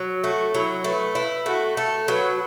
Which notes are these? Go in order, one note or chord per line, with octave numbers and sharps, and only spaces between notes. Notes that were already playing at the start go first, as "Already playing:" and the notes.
Already playing: F#3
A3 F#4
F#3 E4
A3 B4
E4 B4
A3 F#4
A3 A4
F#3 B4